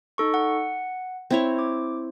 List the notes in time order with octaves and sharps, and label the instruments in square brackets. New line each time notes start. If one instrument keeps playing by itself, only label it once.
[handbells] D#4 A4 C#6
F#5
[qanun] C4 E4 C#5
[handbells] D6